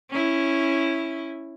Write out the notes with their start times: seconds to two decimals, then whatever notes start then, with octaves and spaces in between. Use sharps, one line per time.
0.10 C#4 E4